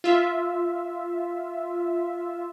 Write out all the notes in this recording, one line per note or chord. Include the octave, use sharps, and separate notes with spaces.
F4 E5